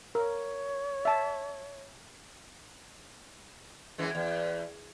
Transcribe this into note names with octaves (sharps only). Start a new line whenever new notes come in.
A#4 C#5
E5 A5
F#2 E3 G#3
E2